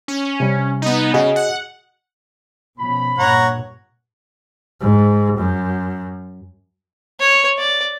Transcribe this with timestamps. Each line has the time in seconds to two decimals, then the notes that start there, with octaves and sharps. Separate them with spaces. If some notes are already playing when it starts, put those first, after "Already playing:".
0.08 C#4
0.40 C3 G3
0.82 B3 D#4
1.14 C#3 F#4 G#4 D#5
1.36 F#5
2.80 B2 F3 C#4 B5
3.19 G2 A#2 C#5 F#5 A#5
4.81 G#2
5.37 F#2
7.20 C#5
7.58 D5